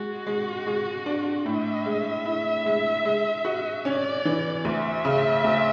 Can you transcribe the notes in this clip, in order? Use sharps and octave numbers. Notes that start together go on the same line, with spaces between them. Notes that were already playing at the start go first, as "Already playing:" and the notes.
Already playing: G#3 F#4
G#3
G#3
D4
A2 E5
G#3
E4
G#3
G#3
F#4
C#4 D5
E3
D2 E5
C#3
D2